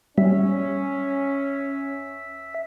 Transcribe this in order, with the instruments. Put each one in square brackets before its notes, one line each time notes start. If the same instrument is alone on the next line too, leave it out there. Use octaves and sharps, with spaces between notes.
[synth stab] G3 [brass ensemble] C#4 [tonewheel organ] E5